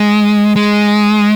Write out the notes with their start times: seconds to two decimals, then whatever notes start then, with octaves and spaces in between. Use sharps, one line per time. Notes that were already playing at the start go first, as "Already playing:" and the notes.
Already playing: G#3
0.56 G#3